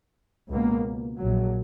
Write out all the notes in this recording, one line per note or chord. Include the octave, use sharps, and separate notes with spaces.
C#2 B2 A#3
A#1 A#2 F#3